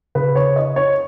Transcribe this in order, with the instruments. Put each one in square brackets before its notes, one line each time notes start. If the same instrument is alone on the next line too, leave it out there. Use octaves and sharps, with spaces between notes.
[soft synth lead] C#3 [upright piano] B4
[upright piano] C#5
D#5
C#5